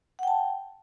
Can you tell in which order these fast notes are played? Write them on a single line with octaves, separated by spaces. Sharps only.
F#5 G5 A5